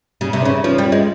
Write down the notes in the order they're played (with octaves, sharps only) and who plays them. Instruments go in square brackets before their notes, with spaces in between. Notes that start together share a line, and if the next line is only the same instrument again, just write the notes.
[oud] C#3 [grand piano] G3
[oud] C3
[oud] C#3 [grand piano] C#4
[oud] F3 [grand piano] C#4
[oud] G3
[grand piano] C#4
[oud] G#3